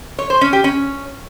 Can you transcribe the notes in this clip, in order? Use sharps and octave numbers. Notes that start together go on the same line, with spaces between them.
C#5
C5
C#4
G4
C#4